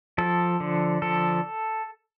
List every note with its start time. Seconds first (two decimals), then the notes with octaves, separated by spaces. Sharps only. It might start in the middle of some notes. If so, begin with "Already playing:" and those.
0.18 F3 A4
0.60 D3
1.02 F3 A4